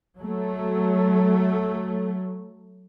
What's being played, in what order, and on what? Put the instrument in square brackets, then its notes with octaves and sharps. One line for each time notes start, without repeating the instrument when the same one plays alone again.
[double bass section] F#3 A3